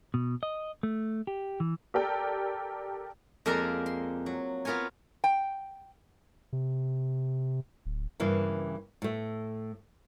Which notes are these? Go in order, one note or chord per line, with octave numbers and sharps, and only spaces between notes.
B2
D#5
A3
G4
E3
G4 A4 A#4 D5 G5
F2 G#3 A#3 A#4 D5 A#5
C6
F#3
B3 F4 A#4 C#5 G#5
G5
C3
D1
G2 C#3 E3 A#3 E4
A2 A3